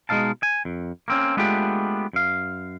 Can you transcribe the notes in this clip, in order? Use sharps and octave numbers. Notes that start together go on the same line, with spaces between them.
B2 G#3 C4 D#4 F5 A5
G#5
F2
A#3 C4 C#4
G#3 A3 B3 D4 F4 G4
F#2 F5